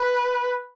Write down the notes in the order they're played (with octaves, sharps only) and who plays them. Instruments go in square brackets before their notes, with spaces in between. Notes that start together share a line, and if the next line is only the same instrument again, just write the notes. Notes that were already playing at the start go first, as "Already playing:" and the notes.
Already playing: [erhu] B4